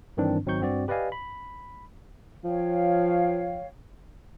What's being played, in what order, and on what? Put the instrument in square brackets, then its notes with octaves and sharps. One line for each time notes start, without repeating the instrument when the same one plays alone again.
[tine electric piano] G2 D#3 E3 C4 D4
G#1 F#3 C4 D#4 C#6 G6
G2 C4 F#4 D5
G4 B4 D5 D#5 F5 G#5
B5
[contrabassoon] F3 [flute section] C#5 F5 G5